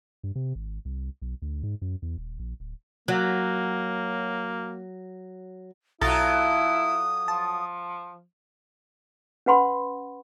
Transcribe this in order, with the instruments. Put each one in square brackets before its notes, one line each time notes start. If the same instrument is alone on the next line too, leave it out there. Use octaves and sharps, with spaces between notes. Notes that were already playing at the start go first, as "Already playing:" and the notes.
[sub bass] G2
C3
G#1
C2
B1
D2
G#2
F#2
E2
D#1
A#1
D1
[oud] F#3 [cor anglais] A#3
[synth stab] B1 A#5 A6 [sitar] F#3 F4 A4 [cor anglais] E4 [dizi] D#6
[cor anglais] F3 [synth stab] A5
[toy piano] C#4 B4 F#5 B5 C6